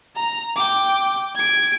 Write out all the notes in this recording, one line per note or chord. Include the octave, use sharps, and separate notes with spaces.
A#5
G5 D6
G#6 D7